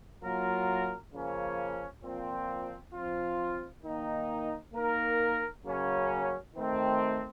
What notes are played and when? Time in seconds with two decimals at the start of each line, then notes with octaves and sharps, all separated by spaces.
0.22 F#3 A#3 F4 A#4
1.13 C#3 F3 A#3 C#4
2.03 A#2 F3 C4
2.93 F3 C4 F4
3.84 D#3 A#3 D#4
4.74 A#3 D#4 A#4
5.64 C#3 F#3 A#3 C#4
6.55 D#3 A3 C4